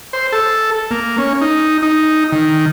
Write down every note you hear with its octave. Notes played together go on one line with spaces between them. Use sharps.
C5
A4
A#3
C#4
D#4
D#4
D#3